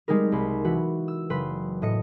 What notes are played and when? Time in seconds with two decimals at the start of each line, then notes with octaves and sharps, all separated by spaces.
0.08 G3 G#3 C4 D#4 A#4
0.32 C2 B5 C6
0.64 E3 F#4 B4
1.08 E6
1.30 F#1 B4 C6
1.82 A2 D#5 C#7